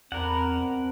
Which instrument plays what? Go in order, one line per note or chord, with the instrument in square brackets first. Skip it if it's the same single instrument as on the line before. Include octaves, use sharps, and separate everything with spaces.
[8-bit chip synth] E2 [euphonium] C4 [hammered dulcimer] D4 G#5 B5 [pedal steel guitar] A#4 F#5